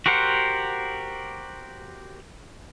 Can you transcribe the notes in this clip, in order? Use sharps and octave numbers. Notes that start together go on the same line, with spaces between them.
F#4 G4 A#4 C5 F#5